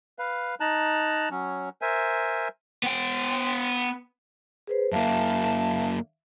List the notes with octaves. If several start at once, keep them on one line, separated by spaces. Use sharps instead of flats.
B4 F5
D#4 A5 A#5 F#6
F#3 C#4
A#4 C5 E5 G#5
B3 G5
G#4 B4 C5
F#2 A#3 E5 F5 A5